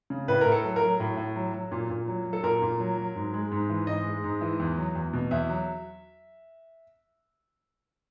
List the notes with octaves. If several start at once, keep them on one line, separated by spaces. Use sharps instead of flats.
C#3
A2 B4
A2 A#4
A4
F#3
A#4
F#3
A2
A2
F#3
F#3
A#2
A#2
F#3
F#3
A4
A#2 A#4
A#2
F#3
F#3
G#2
G#3
G#2
E3
G#2 D#5
G#3
G#2
E3
E2
F#3
E2
B2
E2 E5
F#3